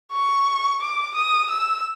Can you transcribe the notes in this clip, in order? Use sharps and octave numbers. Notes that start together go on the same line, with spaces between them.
C#6
D6
D#6
E6